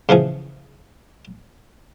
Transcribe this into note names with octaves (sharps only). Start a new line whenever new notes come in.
C#3 E3 F3 G#4